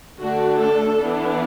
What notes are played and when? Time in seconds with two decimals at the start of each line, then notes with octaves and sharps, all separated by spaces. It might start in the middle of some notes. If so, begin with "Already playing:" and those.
0.18 D3 A3 D4 F#4
0.58 A4
0.97 E3 B3 D4